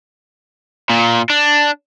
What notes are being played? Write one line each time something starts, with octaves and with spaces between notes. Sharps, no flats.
A#2
D4